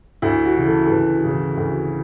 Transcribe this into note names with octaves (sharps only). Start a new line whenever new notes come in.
D2 E4
F#4
C#3 E3
A4
A4
D2 B4
C#3 E3
D2